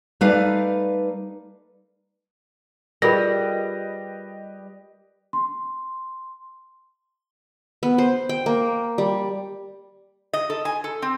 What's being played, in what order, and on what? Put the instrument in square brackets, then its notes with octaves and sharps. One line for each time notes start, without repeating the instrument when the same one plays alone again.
[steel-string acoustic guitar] G3 A3 D#4 B4 D5 F5
[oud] G3 [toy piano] F4 G#4 A#4 [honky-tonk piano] G4 B4 D#5 [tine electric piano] A#6
[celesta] C6
[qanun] B3
C5
G5
A#3
G3
[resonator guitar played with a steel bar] D#5
A4
G#5
A4
C4